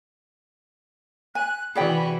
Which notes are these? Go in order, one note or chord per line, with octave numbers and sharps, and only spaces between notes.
G#5 F#6
C3 E3 F#4 G#4 D5 G5 B5